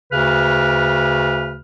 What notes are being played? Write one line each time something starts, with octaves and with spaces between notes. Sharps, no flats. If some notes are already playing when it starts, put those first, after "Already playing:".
D2 C#3 B4 F6